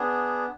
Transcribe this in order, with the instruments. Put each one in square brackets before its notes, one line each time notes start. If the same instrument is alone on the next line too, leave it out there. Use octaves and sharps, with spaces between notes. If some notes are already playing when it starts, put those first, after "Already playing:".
Already playing: [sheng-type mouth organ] B3 D4 G#4